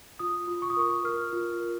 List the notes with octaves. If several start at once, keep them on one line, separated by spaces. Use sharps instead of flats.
F4 D#6
F4
C#6
D#6
A#4 C#6
A#4 F6
F4
A#4